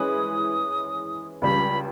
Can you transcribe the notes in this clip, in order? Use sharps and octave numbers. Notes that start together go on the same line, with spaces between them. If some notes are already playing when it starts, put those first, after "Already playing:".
Already playing: E3 G#3 C#4 G#4 B4 D#6
C#2 C#3 G3 B5